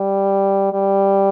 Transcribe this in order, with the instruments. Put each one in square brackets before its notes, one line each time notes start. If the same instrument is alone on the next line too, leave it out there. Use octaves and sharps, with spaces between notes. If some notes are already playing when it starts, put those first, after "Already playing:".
Already playing: [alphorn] G3
G3